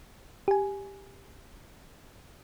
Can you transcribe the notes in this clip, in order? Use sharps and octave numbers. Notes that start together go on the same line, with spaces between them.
G4 G#5